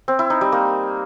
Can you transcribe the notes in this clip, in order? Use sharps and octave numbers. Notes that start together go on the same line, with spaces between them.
C4
E4
D#4
G3
A#3